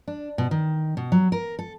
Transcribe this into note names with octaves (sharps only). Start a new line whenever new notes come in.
D4
B2
D#3
B2
F#3
A#4
A4